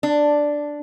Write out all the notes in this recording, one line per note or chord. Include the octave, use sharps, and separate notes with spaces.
D4